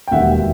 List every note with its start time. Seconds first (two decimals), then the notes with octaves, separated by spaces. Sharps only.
0.07 G5
0.11 E1 D#2 D#3 G3 E5 F#5